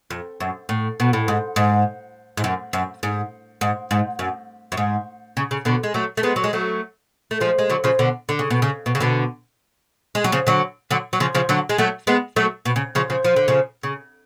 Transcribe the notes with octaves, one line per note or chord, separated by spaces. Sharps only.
F2
F#2
A2
B2
A2
G#2
G#2
G#2
F#2
F#2
G#2
G#2
G#2
F#2
F#2
G#2
C#3
C#3
B2 D3
G#3
F#3 A3
A3
G#3 B3
F#3
G#3
F#3 A3
A3
F3 G#3
G#3
D3 F#3
C#3 F3
B2 D3
D3
C#3
B2
C#3
B2
C#3
B2 D3
G#3
F#3
C#3 F3
D3 F#3
D3 F#3
F#3
C#3 F3
C#3 F3
D3 F#3
G#3
F#3 A3
G#3 B3
F#3 A3
B2
C#3
C#3 F3
C#3 F3
F3
D3
C#3 F3
C#3